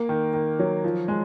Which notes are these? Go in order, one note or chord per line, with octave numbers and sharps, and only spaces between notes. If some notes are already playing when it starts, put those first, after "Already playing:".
Already playing: A#3
D#3
D#3
F#3
F3
G#3